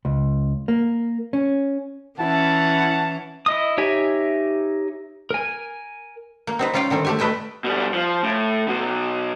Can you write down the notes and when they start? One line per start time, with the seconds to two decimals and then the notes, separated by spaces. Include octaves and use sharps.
0.05 C#2
0.68 A#3
1.33 C#4
2.20 E3 C#4 E4 F#5 A5
3.46 E4 D#5 D#6
3.78 D#4 G4 C#5 E5 G#5
5.31 A#4 G#5
6.47 A#3
6.59 C4 D#4 B4
6.74 G3 C#4 F4 F5 G5
6.90 D3 D#3 G3 C4
7.05 A3 G4 G#5
7.19 A3 B4 D#5 G5 G#5
7.64 B2 G3
7.94 F3
8.23 A2
8.68 B2 F#3